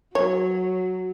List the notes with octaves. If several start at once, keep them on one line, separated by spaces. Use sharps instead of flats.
F#3 C#5